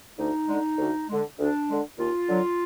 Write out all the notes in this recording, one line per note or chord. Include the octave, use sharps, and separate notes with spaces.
D2 D#4
D3 G#3
D2
D3 G#3
D2 D4
D3 G#3
D#2 F4
D3 F#3